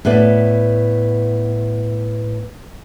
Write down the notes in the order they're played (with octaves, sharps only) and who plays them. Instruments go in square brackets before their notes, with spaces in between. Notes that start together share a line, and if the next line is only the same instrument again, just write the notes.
[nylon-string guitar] A2 B3 B4 D5